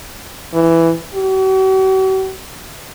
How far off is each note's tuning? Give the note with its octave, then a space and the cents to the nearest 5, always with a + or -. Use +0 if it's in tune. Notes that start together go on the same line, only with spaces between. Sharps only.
E3 +5
F#4 +45